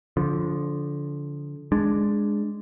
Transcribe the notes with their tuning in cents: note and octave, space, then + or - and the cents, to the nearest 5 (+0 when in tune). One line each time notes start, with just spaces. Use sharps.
D3 -25 F3 +0
G#3 +0 D4 +0